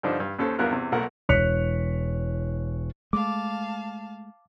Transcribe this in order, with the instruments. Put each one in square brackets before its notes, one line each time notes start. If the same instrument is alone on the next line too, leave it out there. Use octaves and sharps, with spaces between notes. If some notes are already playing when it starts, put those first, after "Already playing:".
[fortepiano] G2 D3 F3 D4 D#4
G2
D#2 C#4 A4 C5
E2 G2 B3 F4 A#4 F#6
E2 C3
B1 A#2 A3 A#4 F#5
[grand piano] E1 C#5 F#6 B6 C#7 F7
[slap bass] G#3 A3 [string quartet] F5 A5 [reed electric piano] D6